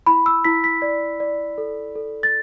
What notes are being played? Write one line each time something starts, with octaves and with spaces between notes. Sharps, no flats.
E4 B5
E6
E4 B6
B6
D5
D5
A4
A4
A6